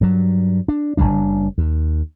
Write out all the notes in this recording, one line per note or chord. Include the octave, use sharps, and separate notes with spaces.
G2 F#3
D4
F#1 F2 G3 D4
D#2